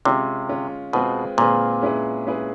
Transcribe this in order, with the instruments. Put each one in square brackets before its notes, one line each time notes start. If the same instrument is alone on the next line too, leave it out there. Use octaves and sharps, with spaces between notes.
[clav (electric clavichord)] C3 [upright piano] G#3 C#4 F4
[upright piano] G#3 C#4 F4
[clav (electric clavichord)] B2 [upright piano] G#3 C4 F4 G#4 B4
[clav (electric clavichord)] A#2 [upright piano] G#3 C4 F4 G#4 B4
[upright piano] G#3 C#4 E4 G#4 B4
G#3 C#4 E4 G#4 B4